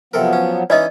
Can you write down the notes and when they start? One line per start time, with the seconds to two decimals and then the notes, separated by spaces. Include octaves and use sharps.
0.14 C3 F3 F#3 B3 A4 A#4
0.33 C#4
0.70 E3 C#4 D#4 D5 D#5